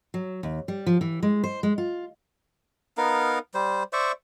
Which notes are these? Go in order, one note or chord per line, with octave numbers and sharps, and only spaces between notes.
F#3
D#2
G3
F3
E3
G#3
C5
G#3
F4
B3 D#4 A#4 F5
G3 C5
C5 D5 E5 C#6